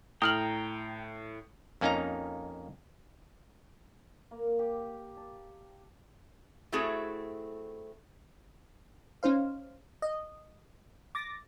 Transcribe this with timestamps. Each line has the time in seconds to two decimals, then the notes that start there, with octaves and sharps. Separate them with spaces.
0.22 A2 G5 A#5 D#6 F6 F#7
1.81 F2 A#3 C#4 D#4 F5 A#5
4.31 A#3
4.59 G4
5.17 A5
6.72 A3 C4 E4 F#4 G#4 A4
9.23 C#4 D#4 C5 F5
10.02 D#5
11.15 D6 A6 A#6